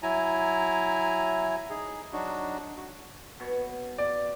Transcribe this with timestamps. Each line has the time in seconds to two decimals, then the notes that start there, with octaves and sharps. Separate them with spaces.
0.03 F#3 E4 G#5 A#5
1.70 D#4 G#4
2.13 F#3 D4 D#4 F#4
2.77 F#4
3.40 B2 C#5
3.98 D5